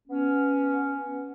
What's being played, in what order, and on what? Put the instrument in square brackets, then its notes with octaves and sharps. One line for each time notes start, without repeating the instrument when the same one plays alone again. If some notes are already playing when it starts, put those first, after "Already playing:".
[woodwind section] B3 C#4